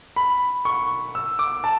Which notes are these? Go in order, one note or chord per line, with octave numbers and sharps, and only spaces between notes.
B5
C#6
E6
D6
A5